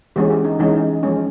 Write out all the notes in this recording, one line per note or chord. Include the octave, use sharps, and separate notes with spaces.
E3 G#3 C#4 G4
G4
D#4
E3 G#3 C#4 D#4
F3 G#3 C#4